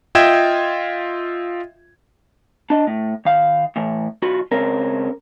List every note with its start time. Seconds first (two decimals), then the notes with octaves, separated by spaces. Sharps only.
0.15 F4 D#5 E5 G5 G#6 E7
2.70 D4 D#5
2.87 A2
3.25 D#3 F5
3.76 A2 E3
4.22 B1 F4 F#4 B5
4.51 C#3 G#3 C4 C#4 A#4